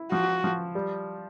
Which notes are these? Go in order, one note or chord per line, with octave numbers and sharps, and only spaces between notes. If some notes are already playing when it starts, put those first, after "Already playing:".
Already playing: E4
F3 F#4
F3
G3